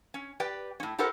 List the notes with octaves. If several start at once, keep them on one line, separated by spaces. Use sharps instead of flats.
C#4
G4 B4 D5 G5
A2 C#4
E4 G4 A4 A#4 C5 F#5